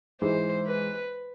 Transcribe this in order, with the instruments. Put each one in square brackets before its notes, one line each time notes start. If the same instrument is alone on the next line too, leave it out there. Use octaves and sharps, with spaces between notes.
[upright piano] G#2 E3 G#3 [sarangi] C5
[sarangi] B4